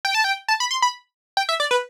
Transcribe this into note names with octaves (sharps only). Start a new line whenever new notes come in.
G5
A5
G5
A5
B5
C6
B5
G5
E5
D5
B4